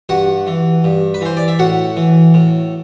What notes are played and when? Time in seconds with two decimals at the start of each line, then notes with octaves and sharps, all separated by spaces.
0.09 G2 F#4 F#5
0.47 E3
0.84 G2
1.14 B4
1.21 E3 C5
1.37 D5
1.48 E5
1.59 A2 F#4 F#5
1.96 E3
2.34 A2